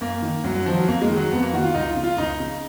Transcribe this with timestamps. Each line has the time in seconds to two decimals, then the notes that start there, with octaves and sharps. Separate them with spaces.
0.01 F#2 A#3
0.22 D#3
0.44 F#2 F#3
0.55 F#3
0.66 D#3 F3
0.76 F#3
0.88 F2 A#3
1.02 G#3
1.09 D#3
1.16 F#3
1.31 F2 B3
1.43 A#3
1.53 D#3 F#4
1.64 F4
1.74 C#2 D#4
1.89 F4
1.96 C#3
2.04 F4
2.18 C#2 D#4
2.40 C#3